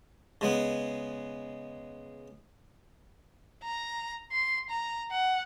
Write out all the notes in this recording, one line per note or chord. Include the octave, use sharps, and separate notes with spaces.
C#3 G#3 B3
A#5
C6
A#5
F#5